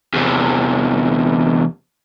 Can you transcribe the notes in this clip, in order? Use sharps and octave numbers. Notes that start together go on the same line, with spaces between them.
E2 C3